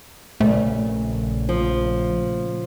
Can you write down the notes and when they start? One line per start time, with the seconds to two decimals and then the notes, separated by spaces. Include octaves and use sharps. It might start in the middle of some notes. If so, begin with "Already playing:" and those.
0.40 A#1 A#2 C#3 A3
1.49 F3